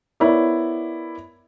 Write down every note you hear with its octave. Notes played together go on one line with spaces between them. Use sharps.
B3 E4 A#4 C#5 D5